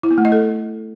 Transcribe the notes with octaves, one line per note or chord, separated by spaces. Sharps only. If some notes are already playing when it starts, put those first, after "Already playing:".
E4
B3
A3
D#5
A4